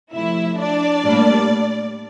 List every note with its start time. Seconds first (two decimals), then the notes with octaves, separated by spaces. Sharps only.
0.13 C3 F3 A3 E4 E5
0.59 D4 D5
1.04 A2 G3 A#3 D4